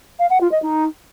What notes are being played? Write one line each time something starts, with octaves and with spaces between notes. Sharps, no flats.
F5
F#5
F4
D#5
D#4